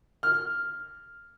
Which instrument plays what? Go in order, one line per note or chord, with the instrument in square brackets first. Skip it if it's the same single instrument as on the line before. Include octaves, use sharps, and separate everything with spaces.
[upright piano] F6